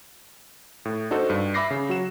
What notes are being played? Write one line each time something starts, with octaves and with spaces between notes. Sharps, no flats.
A2
D4 D#4 F#4 A4 C5
G2
E5 B5 D6 A#6 C7
C#3
F#3 F#4 F#5 E7